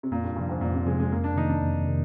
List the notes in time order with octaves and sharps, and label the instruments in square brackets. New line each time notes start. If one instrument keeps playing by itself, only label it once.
[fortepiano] C3
[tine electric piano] F2 [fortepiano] A#2
[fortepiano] G2
[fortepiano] G2 [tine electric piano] C3 F3
[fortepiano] G#2
[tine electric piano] F2 [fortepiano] A#2
[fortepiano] C3
[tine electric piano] C3 F3 [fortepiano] G#3
[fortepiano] G#3
[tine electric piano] F2 [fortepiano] A#3
[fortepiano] D4
[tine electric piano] C3 D#3 A#3 [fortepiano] D#4
[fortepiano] D4
[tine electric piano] F2
C3 D#3